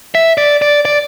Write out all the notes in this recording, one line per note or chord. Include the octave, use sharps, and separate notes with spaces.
E5
D5
D5
D5